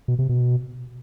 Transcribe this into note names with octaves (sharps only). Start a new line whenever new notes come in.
B2
C3
B2